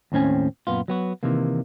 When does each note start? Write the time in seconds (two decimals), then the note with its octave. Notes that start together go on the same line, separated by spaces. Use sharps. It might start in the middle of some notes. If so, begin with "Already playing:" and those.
0.12 D#2 A2 C4 C#4 G#5
0.67 F#2 A#2 B3 F4
0.88 F#3 B3 F#4
1.23 C3 D#3 E3 A#3